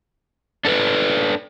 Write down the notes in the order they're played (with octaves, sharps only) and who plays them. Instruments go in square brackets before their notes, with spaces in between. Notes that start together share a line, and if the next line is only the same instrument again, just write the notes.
[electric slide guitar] D4 A4 B4